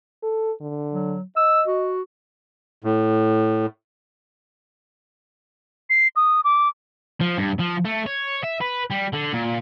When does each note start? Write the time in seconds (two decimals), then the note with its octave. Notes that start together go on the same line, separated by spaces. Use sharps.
0.23 A4
0.61 D3
0.93 F#3
1.36 D#5 E6
1.68 F#4
2.84 A2
5.90 C7
6.16 D#6
6.44 D6
7.21 F3
7.38 G2
7.60 F3
7.85 A3
8.07 C#5
8.44 E5
8.62 B4
8.91 G3
9.14 D3
9.33 A#2